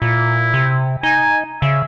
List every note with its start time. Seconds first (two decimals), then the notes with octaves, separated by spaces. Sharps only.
0.02 A#2 E4
0.54 C3
1.03 D#4 G#5
1.62 C#3 E5